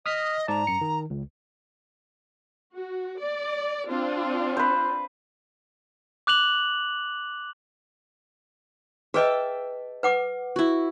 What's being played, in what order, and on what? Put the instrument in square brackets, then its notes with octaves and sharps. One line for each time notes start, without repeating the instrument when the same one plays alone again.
[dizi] D#5 [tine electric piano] D#6 F6 B6
[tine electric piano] G#2 D5 A5 [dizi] A#5
[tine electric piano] F#2 C#7
D#3
C#2
[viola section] F#4
D5
C4 D4 F4
[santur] B4 C5
[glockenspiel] D6 F#6 F7 F#7
[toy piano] G#4 B4 D#5 [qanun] E5 G5 A5
[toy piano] B4 F#5 D6
[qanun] E4 F#4